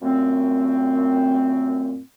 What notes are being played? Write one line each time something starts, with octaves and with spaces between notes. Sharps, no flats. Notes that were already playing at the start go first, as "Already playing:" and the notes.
F#2 A#2 A3 C4